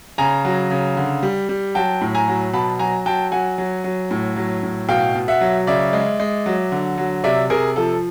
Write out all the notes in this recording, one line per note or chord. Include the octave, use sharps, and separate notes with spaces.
C#3 G#5 A#5
F#3
C#3
D3
G3
G3
F#3 G5 A5
A2
G#5 A#5
F#3
B2 A5 B5
F#3 G#5 A#5
F#3 G5 A5
F#3 F#5 G#5
F#3
F#3
A2
F#3
A2
B2 F5 G5
B2
E5 F#5
F#3
C#3 D5 E5
G#3
G#3
F#3
D3
F#3
C3 D5 E5
C3 G#4 A#4
F3 A4